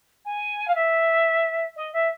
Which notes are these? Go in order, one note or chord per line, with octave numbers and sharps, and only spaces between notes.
G#5
F5
E5
D#5
E5